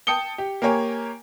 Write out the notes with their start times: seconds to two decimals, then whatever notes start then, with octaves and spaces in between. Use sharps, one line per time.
0.07 G5 A5 D#6 C#7 G7
0.38 G4
0.62 A#3 G4 A#4 C#5 G#5